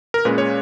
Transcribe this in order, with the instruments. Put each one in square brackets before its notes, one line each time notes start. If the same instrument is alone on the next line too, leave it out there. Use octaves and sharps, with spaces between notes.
[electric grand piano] A#4
A#2 G#3 C#4 B4
C#5